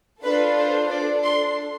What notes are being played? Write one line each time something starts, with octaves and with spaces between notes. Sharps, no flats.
D4 F4 A4 B4
C5
D4 A4 D5
C6